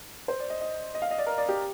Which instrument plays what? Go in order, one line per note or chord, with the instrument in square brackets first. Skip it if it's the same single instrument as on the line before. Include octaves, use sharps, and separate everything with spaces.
[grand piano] C5
D5
D#5
D#5
D#5
F5
D#5
D5
A#4
D5
G4